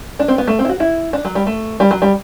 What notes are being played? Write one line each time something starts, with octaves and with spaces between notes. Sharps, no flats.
D4
C4
B3
A3
C4
E4
F#4
E4
D4
F#3
G3
A3
G3
F#3
G3